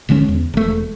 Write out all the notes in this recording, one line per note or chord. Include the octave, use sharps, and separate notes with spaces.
D#1 D3 G#3 C#4
E2
E1 A3